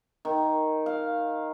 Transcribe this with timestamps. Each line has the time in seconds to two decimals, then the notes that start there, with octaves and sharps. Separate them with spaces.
0.25 D#3
0.86 F5